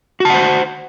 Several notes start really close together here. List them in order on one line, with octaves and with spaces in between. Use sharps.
F#4 A5 F#5 C5